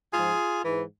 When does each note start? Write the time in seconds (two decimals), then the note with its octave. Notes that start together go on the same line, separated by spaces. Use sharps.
0.13 G#2 F3 F4 G#4
0.65 G#2 E3